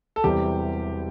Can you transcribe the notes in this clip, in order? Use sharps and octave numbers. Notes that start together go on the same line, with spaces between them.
A4
E1 E2 C3 E3 G3 G4